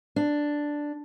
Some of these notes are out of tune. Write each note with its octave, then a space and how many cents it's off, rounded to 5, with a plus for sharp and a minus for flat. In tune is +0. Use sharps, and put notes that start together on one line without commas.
D4 +0